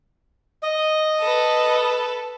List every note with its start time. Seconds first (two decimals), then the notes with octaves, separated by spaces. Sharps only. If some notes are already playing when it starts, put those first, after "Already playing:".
0.63 D#5
1.20 A4 B4